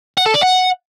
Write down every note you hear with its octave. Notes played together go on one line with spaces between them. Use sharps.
F#5
A4
D5
F#5